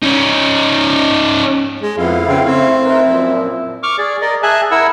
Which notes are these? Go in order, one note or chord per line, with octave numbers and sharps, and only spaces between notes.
C#4 D#4
G#3
F2 B3 E4 F5
C#3 C4
A3 C4
D#4 E4 A#4 B4
F#2 A#2 F3
C#6 D6 F6
G#4 D5
A#4 D5 D#5
G#4 E5 G#5 A5 F#6
E4 A#4 F#5 E6